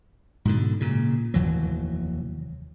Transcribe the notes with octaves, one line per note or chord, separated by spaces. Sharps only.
G#2 B2 D3
A#2 C#3
F1 D#2 E3 F#3